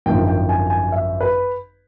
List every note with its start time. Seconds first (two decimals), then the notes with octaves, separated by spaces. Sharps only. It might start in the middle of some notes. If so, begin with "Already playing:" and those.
0.06 G#1 F#2 D3 F3 G5
0.28 G5
0.49 G#5
0.70 G#5
0.92 E5
1.21 B4